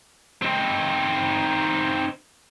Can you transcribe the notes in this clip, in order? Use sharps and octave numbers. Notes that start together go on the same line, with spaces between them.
C4 D#4